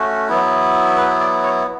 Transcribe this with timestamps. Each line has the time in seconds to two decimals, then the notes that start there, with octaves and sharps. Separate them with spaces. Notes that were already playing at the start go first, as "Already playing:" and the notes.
Already playing: A3 C#4 F#4
0.28 F#3 B3 E4
0.97 B4
1.20 D5
1.43 C#5